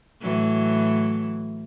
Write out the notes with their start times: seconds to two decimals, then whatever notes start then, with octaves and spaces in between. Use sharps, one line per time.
0.21 A2 E3 F#3